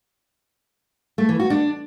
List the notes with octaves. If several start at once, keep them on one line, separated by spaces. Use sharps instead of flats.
A3
E3
F#4
D4